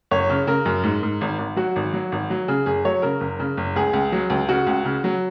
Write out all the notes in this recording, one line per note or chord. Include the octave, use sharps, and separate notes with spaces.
F#1 C#5
C#3
C#3 A#4
F#2
G#2
G#2
G#1
G#1
F#3 F#4
G#1
F#3
G#1
F#3
C#3 G#4
F#1 G#4
F#3 C#5
C#3 A#4
F#1
C#3
F#1
C#2 G#4
C#2
F#3
C#2
C#3 F#4
C#2
C#3
F#3